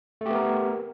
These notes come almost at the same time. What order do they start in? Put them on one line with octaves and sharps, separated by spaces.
A3 G4 B3 A#4